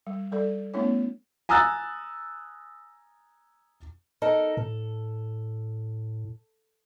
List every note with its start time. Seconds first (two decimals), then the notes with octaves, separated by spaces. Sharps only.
0.07 G3
0.32 G3 A4 D5
0.74 A3 B3 C#4 E4 C#5
1.49 G#5 A#5 D#6 E6 F#6 A6
4.22 D#4 A4 A#4
4.57 A2 A4